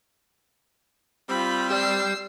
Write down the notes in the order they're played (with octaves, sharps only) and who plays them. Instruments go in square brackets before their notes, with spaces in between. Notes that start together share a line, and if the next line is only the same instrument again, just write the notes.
[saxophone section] G3 C4 [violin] F4 B5
[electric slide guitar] G4 D5 [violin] E6 C7